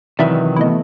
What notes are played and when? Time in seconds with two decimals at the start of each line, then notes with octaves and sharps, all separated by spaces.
0.19 C3 D#3 E3 F#3 D5 E5 B5
0.56 A3 B3 C4 E4 D#5